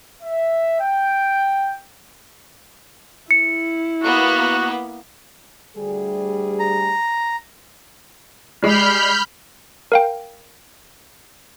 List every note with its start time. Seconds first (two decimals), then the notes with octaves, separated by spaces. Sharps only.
0.20 E5
0.79 G5
3.31 E4 C#7
4.03 A#3 B3 F#4
5.76 D2 G3 G#4
6.59 A#5
8.63 G3 G#3 B5 F6 G6
9.92 A#4 F5 G5